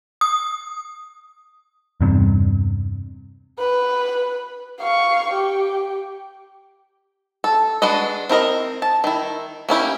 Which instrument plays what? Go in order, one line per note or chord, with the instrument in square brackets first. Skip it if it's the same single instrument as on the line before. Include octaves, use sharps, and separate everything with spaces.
[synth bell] D#6
[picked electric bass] E2 G2 C3
[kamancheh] B4
F5 C#6
G4
[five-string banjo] A4
G#3 D4 F#4 B4 D#5
C4 E4 A#4 D#5
A5
D#3 E4
A#3 C#4 E4 G4